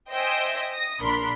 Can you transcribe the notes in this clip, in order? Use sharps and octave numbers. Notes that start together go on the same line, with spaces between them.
C5 D#5 E5 G5 G#5
D#6 A#6
A#1 D4 A#4 B5 C6